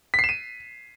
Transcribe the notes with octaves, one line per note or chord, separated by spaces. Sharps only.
B6
C7
E7
D#7